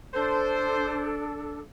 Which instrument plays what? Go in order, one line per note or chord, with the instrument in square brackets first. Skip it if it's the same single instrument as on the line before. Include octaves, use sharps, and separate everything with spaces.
[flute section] D4 A4 [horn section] C5